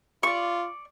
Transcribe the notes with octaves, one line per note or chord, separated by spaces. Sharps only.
F4 D5 C#6